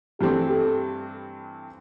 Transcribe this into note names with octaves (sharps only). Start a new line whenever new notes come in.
G2 E3 A3 C4 G4
A4